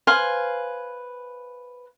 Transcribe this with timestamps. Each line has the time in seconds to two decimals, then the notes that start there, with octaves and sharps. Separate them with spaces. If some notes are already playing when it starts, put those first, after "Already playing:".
0.07 B4 C5 F5 G#5